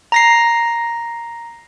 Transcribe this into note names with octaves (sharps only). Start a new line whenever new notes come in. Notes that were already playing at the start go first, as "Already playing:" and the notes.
A#5 A#6 C7